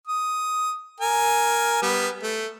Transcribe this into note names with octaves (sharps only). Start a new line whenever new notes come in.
D#6
A#4 G#5
G3 B3
A3